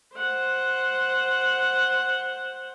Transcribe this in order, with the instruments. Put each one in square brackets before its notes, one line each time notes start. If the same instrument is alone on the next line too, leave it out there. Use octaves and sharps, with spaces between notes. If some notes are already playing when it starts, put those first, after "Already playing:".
[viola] C5 F#5